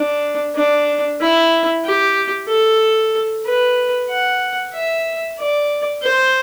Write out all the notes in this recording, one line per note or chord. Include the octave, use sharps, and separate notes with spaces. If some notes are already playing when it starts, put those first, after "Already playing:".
Already playing: D4
D4
E4
G4
A4
B4
F#5
E5
D5
C5